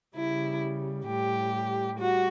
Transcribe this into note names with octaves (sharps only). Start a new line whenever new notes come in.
C#3 G3 E4
A2 G3 G4
G3 F#4